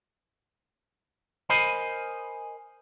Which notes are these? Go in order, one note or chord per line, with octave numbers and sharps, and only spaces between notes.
A#4 C5 D#5 G#5 B5